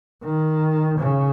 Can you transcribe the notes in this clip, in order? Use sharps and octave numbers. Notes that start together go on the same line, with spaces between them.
D#3
C#3